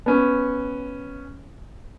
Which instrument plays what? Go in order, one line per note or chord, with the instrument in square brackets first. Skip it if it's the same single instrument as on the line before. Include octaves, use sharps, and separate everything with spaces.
[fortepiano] B3 C#4